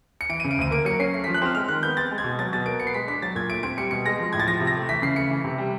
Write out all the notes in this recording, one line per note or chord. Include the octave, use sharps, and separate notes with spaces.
C#7
E3 D7
D#7
C#3
D7
D2 D#7
A#3 D7
F#3 C#7
C#4 C7
A3 C7
F3 B6
F#6
C4 F6
G#3 F6
D#3 F#6
B3 G6
C4 A6
G#3
G#6
B2
F#3 A6
B2 A6
A#3 D7
B3 C#7
C7
G#3 B6
D4 B6
F#3 A6
A#2 G#6
A3 D7
C4 D7
G3 C#7
B2 C#7
G#3 A#6
F3
A2 G#6
A6
F3 A#6
C3
A#6
A3
E3 B6
C#3 C7
A3 C#7
E3
C3
G3